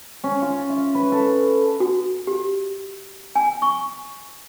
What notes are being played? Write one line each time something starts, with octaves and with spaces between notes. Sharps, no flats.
C#4
F4
E5
B4
A4
F#4
G4
G#5
C#6